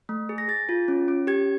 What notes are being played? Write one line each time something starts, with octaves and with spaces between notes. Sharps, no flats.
A3
G#4
A#6
G#4 A6
F4
C#4
C#4
G4 G#6